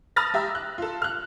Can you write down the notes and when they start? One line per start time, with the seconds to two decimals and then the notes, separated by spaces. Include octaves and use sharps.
0.16 A5 B5 D#6 F6 A6 A#6
0.34 G4 E5 A#5 E6
0.55 F#6
0.78 F4 A4
1.02 F6 F#6